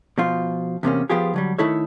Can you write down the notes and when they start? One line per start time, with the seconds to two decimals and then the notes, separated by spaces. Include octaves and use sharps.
0.18 B2 F3 F4
0.83 E2 C3 A#3 C#4
1.10 F3 B3 F4 G4 G#4
1.34 D3 F#3 G3
1.58 D#3 A3 E4 A4 C#5